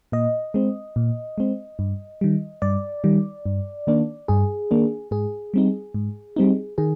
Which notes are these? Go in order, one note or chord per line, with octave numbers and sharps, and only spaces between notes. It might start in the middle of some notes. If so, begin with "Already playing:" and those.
A#2 D#5
G#3 C4
A#2
G#3 C4
G2
D#3 G3
G2 D5
D#3 G3
G2
D#3 A#3 D4
G2 G#4
D#3 A#3 D4
G#2 G#4
G3 C4 D#4
G#2
G3 C4 D#4
D#3 G#4